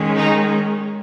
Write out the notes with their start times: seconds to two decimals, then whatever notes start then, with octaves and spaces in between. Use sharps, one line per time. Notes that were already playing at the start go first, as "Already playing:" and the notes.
Already playing: D#3 G#3 C#4
0.17 D#4